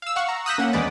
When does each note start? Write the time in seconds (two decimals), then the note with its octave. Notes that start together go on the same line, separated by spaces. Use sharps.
0.02 F5 E6
0.16 F5 F#5 C#6
0.28 A#5
0.46 D#6 E6 F#6 G6 A#6 B6
0.58 A#3 C#4 F#5
0.73 E2 D#3 G#3 B4 D5